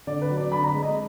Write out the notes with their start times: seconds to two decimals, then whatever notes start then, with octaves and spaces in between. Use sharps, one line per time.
0.07 D3 D5
0.21 B4
0.30 F#3
0.37 D5
0.52 D3 B5
0.64 A#5
0.67 B5
0.74 G#3
0.83 D#5